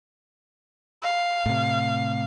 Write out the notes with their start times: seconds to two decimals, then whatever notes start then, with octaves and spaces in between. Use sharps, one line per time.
1.03 F5
1.46 A2 C3